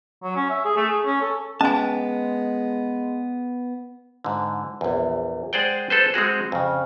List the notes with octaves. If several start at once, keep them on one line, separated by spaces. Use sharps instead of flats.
F#3
C#4
E5
G#4
A3
G#4
C#4
A4
G#3 B3 C#4 G#5 A5
G#2 D3
A#1 E2
G#3 G#4 C5 D5 F#5 G5
G#4 A4 B4 C5
G#3 C4 F#4 G#4
F2 C#3